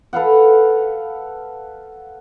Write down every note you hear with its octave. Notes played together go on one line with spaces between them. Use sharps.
A4 B4 F5 F#5